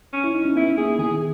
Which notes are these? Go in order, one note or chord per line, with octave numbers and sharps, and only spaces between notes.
C#4
E4
D#4
C#4
B3 E4
A#3 G#4
D#3 G#4